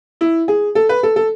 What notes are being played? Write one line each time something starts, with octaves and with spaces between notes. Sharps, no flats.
E4
G#4
A4
B4
A4
A4